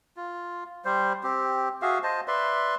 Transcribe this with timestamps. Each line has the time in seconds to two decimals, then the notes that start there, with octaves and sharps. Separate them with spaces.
0.17 F4
0.85 G3 C5
1.23 C4 G4
1.82 F#4 G#4 E5 F5
2.03 C5 D#5 A5
2.28 B4 D5 E5 C6